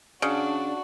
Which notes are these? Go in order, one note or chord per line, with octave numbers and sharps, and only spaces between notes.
C#3 D4 F#4